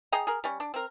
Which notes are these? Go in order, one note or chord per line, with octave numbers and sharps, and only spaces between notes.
G#4 D#5 G5 A#5
G#4 A#4
G3 C#4
D4
C4 A#4